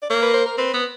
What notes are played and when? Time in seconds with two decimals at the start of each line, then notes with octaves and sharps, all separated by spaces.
0.02 D5
0.10 A#3 C#5
0.22 B4
0.34 C5
0.46 A#4
0.58 C4 B4
0.74 B3